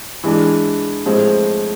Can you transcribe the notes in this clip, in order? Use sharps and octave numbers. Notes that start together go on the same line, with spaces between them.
E3 G#3 D4
A2 F3 G#3 C4